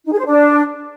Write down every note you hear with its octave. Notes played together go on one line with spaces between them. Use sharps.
D#4
G#4
C5
D4